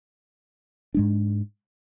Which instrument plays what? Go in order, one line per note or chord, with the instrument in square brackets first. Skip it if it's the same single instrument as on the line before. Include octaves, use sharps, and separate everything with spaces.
[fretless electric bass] G#2 G#3 D4